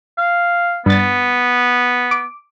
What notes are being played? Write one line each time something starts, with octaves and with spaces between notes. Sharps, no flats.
F5
G2 B3 A6
D6